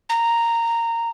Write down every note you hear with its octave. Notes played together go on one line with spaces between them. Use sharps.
A#5